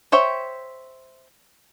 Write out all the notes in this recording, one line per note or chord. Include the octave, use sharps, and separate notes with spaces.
C5 C#5 E5 G5